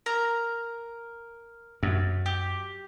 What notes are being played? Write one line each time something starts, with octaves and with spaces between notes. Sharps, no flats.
A#4 A#5
F#2
G4